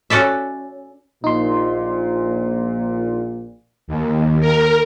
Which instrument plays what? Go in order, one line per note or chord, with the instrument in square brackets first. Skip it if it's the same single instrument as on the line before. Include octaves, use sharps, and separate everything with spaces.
[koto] C#4 F#4 A4 D5 E5
[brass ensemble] A#1 A#2 [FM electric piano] D#4 C6
[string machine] D#2
A#4